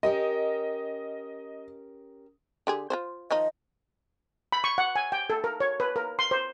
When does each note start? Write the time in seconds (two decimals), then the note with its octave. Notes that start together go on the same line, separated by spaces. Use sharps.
0.03 C#4 G4 A#4 D#5
2.67 D3 G4 G#4
2.90 F4 F#4 C5
3.31 D#3 F3 D#4 D#5
4.52 B5
4.64 C#6
4.78 F#5
4.96 G#5
5.12 G5
5.30 A4
5.44 A#4
5.60 C#5
5.80 B4
5.96 A#4
6.19 C6
6.31 C5